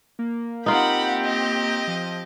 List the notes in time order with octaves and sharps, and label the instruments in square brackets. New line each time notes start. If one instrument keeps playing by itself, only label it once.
[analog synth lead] A#3
[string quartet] C4 G4 G6 [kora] D#4 F4 [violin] F#5 B5
[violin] D#5
[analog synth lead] F3